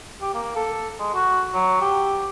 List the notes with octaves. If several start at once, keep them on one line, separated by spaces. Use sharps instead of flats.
G4
A#3
A4
G#3
F#4
F#3
G4